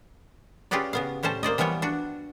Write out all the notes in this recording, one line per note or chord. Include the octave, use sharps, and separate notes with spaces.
C#4 F4 G4 G#4 B4 D5
C#3 B3 F5
A2 G3 C#4 C5 A5
A#3 C5 D5 D#5
E3 F3 G3 B3 C#5
D4 F#4